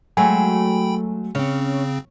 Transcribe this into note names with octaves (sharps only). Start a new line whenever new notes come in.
F#3 G#3 A3 G5 G#5 B5
C#3 C4 C#4